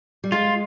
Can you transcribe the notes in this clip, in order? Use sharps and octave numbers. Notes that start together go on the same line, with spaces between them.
G3
G#3 F4